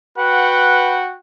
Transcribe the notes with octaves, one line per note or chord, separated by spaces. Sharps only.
F#4 B4 F#5 G5